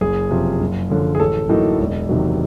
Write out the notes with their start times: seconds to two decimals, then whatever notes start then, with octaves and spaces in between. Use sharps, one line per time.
0.01 F#1 G#4
0.31 F2 C3 F3
0.61 F#1
0.90 F#2 D3 F3
1.15 G#4
1.20 A1 A4
1.49 A2 F#3 A#3 D#4
1.79 E1
2.09 E2 C3 D#3 F#3